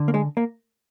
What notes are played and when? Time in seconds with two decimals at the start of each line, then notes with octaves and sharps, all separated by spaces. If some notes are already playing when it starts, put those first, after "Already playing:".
Already playing: D3
0.08 A#3
0.14 G#3
0.37 A#3